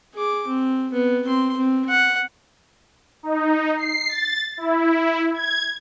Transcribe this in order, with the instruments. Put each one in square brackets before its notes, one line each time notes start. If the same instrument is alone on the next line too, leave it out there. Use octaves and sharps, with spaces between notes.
[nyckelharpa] G#4 D6
C4
B3
C4 C6
C4
F#5
[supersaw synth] D#4
C7
A6
E4
G#6